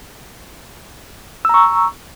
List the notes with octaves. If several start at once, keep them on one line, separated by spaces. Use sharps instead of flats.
A#5 C#6 E6